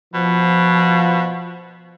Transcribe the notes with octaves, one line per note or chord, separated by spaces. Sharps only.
B2 F3